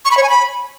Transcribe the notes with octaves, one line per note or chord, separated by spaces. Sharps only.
C#6
B5
C#5
G#5
B5